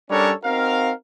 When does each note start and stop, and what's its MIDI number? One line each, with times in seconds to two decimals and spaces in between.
0.10 0.33 55
0.10 0.33 61
0.10 0.33 62
0.10 0.33 69
0.10 0.33 70
0.10 0.33 73
0.44 0.91 60
0.44 0.91 63
0.44 0.91 66
0.44 0.91 70
0.44 0.91 77